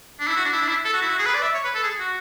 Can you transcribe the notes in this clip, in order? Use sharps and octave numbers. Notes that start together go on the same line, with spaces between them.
D4
E4
F#4
D4
E4
D4
E4
A4
F#4
E4
F#4
G#4
B4
D5
E5
C#5
B4
A4
G#4
F#4